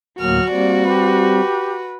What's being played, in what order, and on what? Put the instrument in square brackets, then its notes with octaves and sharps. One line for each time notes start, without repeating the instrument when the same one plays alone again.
[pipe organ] D2 A2 A#3 [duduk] F#3 [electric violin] F#4 [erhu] F6
[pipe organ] G3 C4 [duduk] A#3 [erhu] D5
[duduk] G4 [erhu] B4